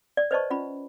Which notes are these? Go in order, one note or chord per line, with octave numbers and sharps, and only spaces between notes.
D5
B4 C5 D5 D#5 A5 C#6
C#4 F4 B5